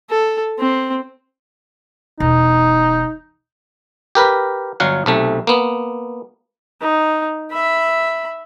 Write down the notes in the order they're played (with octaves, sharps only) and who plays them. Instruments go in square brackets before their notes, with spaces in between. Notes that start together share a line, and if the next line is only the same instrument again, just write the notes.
[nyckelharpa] A4
C4
[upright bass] E1 [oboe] D#4
[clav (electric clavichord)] G4 A#4 B4
G1 F#3 F5 F#5
B1 C3 A3
A#3 B3
[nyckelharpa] D#4
E5 B5